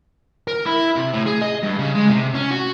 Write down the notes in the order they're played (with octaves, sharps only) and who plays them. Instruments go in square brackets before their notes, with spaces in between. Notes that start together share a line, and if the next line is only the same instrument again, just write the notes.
[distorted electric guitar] A#4
E4
C3
A2
G#4
D#5
G2
C#3
G#3
C3
C#4
F#4